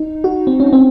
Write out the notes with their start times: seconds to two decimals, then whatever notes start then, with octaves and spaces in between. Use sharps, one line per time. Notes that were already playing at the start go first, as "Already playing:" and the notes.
Already playing: D#4
0.24 F#4
0.47 C4
0.60 C#4
0.73 C4